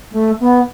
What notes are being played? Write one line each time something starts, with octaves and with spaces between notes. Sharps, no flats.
A3
B3